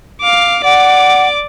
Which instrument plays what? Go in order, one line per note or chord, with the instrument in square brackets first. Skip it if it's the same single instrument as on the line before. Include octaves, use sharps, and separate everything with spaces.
[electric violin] F5 D6
[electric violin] D5 D6 [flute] F#5